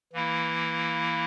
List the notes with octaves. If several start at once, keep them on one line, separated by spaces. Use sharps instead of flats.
E3 A#3 E4